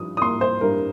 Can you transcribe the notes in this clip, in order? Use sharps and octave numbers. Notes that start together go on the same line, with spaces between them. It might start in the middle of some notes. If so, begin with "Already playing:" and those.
Already playing: G2 F3 D#6
D#6
A#3 C6
C5
G2 A#4